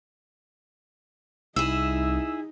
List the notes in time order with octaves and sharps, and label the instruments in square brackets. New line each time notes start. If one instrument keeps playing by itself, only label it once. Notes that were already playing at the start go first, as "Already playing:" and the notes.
[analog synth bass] C2 [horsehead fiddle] D#4 [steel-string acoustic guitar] E4 G#4 [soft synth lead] E6